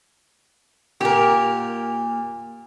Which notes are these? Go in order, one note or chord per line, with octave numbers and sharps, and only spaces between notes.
A#2 G4 A#4